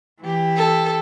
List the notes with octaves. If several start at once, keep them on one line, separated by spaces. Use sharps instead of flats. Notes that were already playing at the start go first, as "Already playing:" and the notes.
E3 G4
A4